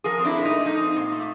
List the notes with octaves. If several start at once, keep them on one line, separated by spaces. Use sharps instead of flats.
F3 G#4 A#4
C4
D4 E4
A#2
D#4
A3
F3 D#4
C4
A#2
A3